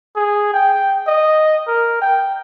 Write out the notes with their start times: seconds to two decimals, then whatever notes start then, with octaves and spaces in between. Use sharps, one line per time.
0.16 G#4
0.54 G5
1.07 D#5
1.67 A#4
2.02 G5